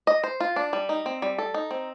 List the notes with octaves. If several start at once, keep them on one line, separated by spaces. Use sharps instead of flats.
D#5
C5
F4
D4
G3
D#4
C4
G3
A4
D#4
C4